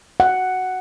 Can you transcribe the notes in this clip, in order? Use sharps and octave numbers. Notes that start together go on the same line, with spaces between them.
F#5